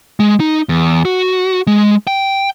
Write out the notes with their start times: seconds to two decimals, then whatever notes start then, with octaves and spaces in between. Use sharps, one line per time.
0.20 G#3
0.40 D#4
0.69 E2
1.05 F#4
1.67 G#3
2.07 G5